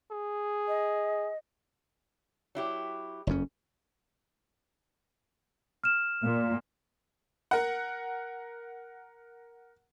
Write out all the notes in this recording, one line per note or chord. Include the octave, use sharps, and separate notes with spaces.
G#4
D#5
F#3 E4 G4
F#1 F2 C#4
F6 E7
A#2
A#4 F#5